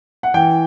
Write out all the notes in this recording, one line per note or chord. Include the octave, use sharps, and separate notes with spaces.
F#5
E3 G5